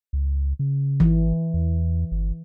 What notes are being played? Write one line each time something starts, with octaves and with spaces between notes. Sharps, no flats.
C#2
C#3
G#1 E3
E2
G1